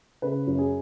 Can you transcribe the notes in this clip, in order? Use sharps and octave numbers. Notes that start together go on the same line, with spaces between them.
C#3 B4
F#2
G#4